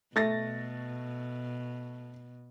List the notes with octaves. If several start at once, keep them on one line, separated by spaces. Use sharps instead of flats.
B2 A3 A6 A#6